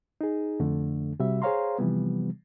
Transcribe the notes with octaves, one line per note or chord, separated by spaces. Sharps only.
D#4 G#4
F2 D3 A3 D4
C3 G3 F#4 E5
G#4 C5 C#5 F5 A#5 C6
C3 E3 F3 G3 B3